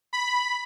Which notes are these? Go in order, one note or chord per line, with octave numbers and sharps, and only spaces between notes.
B5